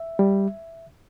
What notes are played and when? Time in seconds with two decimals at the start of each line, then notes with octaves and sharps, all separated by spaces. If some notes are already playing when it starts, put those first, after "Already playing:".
Already playing: E5
0.19 G3